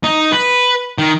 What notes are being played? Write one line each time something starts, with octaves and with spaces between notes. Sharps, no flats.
D#4
B4
D#3